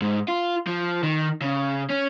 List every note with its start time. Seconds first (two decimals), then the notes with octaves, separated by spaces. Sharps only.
0.02 G#2
0.28 F4
0.67 F3
1.03 D#3
1.41 C#3
1.90 C#4